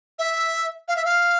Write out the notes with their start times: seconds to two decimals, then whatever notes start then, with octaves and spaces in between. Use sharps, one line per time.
0.19 E5
0.88 F5
0.97 E5
1.05 F5